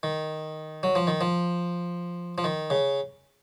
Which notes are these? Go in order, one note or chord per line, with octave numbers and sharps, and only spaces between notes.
D#3
F#3
F3
D#3
F3
F3
D#3
C#3